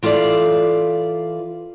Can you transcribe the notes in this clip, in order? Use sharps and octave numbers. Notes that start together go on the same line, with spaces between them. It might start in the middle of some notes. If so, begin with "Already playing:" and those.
E3 F4 A4 B4 D5